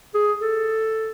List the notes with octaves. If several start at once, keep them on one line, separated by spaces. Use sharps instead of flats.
G#4
A4